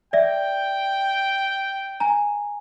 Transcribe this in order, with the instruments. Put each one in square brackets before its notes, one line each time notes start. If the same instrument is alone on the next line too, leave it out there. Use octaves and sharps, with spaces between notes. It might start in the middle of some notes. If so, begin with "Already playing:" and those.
[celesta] D5 E5 [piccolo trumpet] G5
[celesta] G#5 A#5